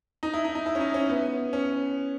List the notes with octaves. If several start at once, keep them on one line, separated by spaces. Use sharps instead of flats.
D#4
E4
D#4
D#4
E4
C#4
D#4
C#4
B3
C#4